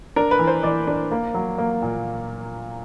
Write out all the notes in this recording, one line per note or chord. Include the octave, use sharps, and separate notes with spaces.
D4 A#4
B4
E3
C5
E3 D5
D4
A#3
F#3
A#3
A#2